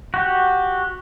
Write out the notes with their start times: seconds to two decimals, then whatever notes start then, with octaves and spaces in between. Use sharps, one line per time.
0.14 F#4 G4